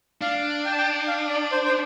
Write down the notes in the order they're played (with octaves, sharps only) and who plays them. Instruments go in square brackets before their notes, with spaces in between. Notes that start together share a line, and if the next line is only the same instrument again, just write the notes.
[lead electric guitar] D4 [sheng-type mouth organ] F5
[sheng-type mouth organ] G5
A5
G5
F5
D5
C5
C5